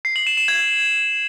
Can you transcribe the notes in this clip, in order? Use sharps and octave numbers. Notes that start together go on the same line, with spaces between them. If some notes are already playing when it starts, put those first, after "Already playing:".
C7
F#7
E7
E7
G#6